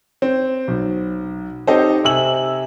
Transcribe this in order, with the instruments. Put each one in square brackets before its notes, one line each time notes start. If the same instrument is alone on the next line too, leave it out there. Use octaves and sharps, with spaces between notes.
[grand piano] C4
B1
C4 D#4 G4 A4 C5
C3 G#5 E6 F#7